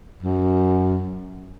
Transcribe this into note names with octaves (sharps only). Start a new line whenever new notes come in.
F#2